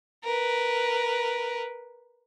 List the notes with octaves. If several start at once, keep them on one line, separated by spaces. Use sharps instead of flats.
A#4 B4